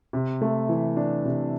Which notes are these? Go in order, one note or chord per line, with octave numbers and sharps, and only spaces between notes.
C3
A3
E3
D4
C3